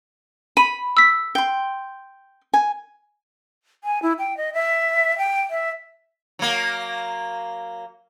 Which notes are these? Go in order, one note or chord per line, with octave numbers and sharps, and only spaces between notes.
B5 D#7
E6 B6
G5 C6
G#5
G#5
E4
G5
D#5
E5
G5
E5
F#3 A#3